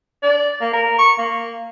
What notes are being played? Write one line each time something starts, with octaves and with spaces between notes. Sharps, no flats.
D5
A#3
A#4
C#6
A#3